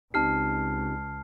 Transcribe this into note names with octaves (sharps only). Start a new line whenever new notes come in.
C#2 C4 D#4 G4 A5 F6 C7